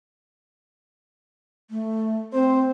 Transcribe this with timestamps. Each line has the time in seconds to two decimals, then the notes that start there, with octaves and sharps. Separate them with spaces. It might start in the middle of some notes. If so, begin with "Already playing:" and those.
1.71 A3
2.34 C4 C5